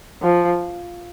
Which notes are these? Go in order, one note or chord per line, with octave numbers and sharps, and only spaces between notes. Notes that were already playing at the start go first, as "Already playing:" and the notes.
F3